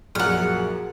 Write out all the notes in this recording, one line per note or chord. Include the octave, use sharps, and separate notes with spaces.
A#1 F#2 F#4 G#4 A#4 F#5 F6